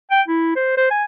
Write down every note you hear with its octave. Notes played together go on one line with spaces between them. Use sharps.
G5
E4
C5
C5
G#5